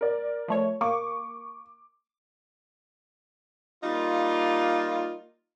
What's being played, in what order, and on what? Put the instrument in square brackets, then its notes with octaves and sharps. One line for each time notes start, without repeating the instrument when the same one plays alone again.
[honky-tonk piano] A#4 D5
[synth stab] F3 A3 C#5
[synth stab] A#3 [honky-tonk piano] C#6 D6
[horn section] G3 A#3 D#4 F4